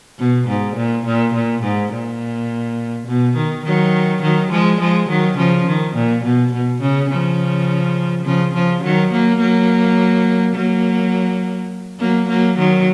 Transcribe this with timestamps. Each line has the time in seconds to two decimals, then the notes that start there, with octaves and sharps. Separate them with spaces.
0.19 B2
0.48 G#2
0.76 A#2
1.05 A#2
1.34 A#2
1.63 G#2
1.92 A#2
3.07 B2
3.36 D#3
3.65 D#3 F#3
4.22 D#3 F#3
4.51 F3 G#3
4.80 F3 G#3
5.09 D#3 F#3
5.37 C#3 F3
5.67 D#3
5.95 A#2
6.24 B2
6.53 B2
6.82 C#3
7.10 C#3 F3
8.25 C#3 F3
8.54 C#3 F3
8.83 D#3 F#3
9.11 F#3 A#3
9.40 F#3 A#3
10.55 F#3 A#3
11.99 F#3 A#3
12.28 F#3 A#3
12.58 D#3 F#3